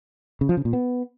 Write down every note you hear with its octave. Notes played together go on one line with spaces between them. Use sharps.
C#3
F3
C#3
A#2
B3